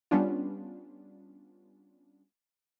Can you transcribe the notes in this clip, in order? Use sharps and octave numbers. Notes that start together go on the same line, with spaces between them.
G3 B3 C#4 D4 F4